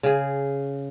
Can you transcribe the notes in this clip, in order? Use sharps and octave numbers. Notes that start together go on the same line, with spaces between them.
C#3 G#4